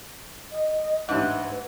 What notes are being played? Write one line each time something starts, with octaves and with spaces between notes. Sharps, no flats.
D#5
A1 G#2 D4 E4 B4 F#5